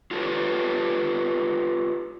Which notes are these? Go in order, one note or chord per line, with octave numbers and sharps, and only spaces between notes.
F4 G4 A4 B4 C#5